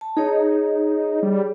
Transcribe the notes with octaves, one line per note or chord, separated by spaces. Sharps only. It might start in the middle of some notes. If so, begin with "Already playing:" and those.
A5
D#4 G#4 C#5
G3